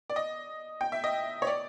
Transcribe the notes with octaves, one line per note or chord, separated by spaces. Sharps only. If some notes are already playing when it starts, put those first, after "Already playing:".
D5
D#5
G5
E5
D#5
C#5
D5